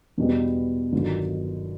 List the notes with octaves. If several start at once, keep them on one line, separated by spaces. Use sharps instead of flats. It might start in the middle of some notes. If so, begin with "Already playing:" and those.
E2 B2 G3 B3
G1 G2 D#3 F#3